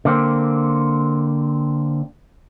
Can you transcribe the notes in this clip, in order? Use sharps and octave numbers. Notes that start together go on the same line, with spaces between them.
D3 A#3 C4